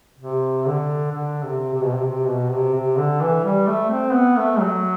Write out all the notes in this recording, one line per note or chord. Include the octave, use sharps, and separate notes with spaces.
C3
D3
D3
C3
C3
B2
C3
C3
B2
C3
C3
D3
E3
G3
A3
C4
B3
A3
F#3